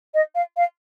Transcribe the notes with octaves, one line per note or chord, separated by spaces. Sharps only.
D#5
F5
F5